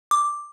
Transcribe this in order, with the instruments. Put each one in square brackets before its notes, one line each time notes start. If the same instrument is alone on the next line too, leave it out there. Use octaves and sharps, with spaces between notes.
[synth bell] D6